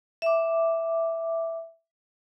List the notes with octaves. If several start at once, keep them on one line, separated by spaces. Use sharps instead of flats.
E5 D6